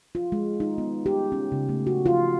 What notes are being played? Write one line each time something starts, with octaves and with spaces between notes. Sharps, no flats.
F4
G#3
D#4
B3
G4
C#4
C#3
A3
F#4
F4